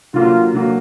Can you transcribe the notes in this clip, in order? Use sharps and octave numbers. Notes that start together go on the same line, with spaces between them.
D3 F#3 A#3 F4
D3 F#3 A#3